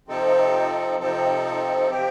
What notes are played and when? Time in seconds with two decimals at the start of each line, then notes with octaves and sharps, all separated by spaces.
0.08 C3 F3 C4 D#4 A4
1.00 C3 F3 C4 D#4 A4
1.90 C3 F3 C4 G4